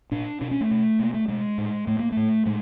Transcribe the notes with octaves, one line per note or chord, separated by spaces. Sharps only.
A#2 D4
B2 D4
C#4
A3
B2
B2 A#3
A3
B2 G#3
A2
A2 A3
A#3
A2 A3
A2 G#3